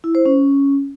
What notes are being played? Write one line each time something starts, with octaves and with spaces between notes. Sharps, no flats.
E4
C5
C#4